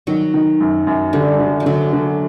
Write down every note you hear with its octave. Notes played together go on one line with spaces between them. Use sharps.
D#3 F#3
D#3
F#2
F#2
D3 G3
D3
F3
D3 F#3
D3